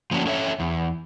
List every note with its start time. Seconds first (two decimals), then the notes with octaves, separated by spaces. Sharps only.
0.11 F3 A#3 C#4 D4 F#4
0.26 C#4 A4 C#5 E5
0.60 E2